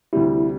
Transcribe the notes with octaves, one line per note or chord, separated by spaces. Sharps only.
D2 C3 G3 E4